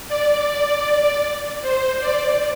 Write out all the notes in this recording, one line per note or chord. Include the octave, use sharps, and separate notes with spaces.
D5
C5
D5